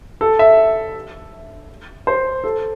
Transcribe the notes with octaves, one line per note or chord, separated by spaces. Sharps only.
A4
E5
C5
A4